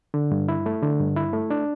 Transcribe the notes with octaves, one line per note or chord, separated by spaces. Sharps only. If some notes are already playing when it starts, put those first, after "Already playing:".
D3
G2
E4
A3
D3
G2
E4
A3
D4